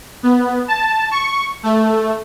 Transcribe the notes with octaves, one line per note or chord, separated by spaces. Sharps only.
B3
A5
C#6
A3